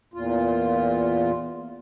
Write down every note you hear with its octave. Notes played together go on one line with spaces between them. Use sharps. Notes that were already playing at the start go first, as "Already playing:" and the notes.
E2 A#2 F4